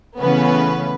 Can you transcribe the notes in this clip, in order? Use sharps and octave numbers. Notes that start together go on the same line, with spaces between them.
C#3 E3 A3 B3 C#4 B4